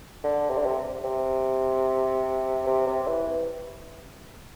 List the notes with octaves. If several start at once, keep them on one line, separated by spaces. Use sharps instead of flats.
D3
C3
D3
C3
C3
C3
C3
E3